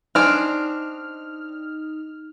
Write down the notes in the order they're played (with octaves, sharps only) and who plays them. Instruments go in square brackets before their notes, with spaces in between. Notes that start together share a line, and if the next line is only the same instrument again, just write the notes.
[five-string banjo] C4 D4 G#5 [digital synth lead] D#4 [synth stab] F6